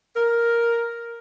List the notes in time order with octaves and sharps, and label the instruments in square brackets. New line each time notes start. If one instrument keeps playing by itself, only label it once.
[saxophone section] A#4